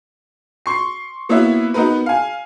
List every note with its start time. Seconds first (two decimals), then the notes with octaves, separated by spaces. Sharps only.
0.66 C6 C#6 C7
1.29 A#3 B3 E4 F#4 C#5 E5
1.74 B3 D#4 F#4 A#4 B4
2.06 F5 G#5